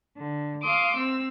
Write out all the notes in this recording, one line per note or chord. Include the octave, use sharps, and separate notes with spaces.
D3
F5 C6 D6 D#6
C4 E6